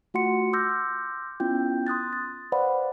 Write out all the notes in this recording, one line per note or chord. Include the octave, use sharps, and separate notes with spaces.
A3 F4 F#4 F#5 C6 C#7
C6 D6 E6 F6 G6 A#6
B3 C#4 E4 F4 G5 G6
C6 D#6 F#6 A6
A6
B4 C5 D5 F5 F#5 B5